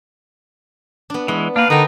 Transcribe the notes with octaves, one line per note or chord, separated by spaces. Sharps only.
B3 D4
E3 G#3 B3
A#3 D4 B4 F5
D3 D#4 A#4 G5